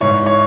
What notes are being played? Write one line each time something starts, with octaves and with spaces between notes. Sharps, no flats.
G#2 E3 C#5
C#5